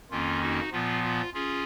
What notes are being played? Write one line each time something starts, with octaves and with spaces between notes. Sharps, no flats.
F2 D#3 A#3 C#4 F4
D#4 F#4
A#2 F3 B3 F4
F4
C#4 F4 G#4